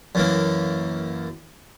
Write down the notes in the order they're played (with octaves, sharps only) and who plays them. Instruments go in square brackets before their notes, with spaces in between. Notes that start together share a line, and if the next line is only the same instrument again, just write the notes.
[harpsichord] F#2 E3 A#3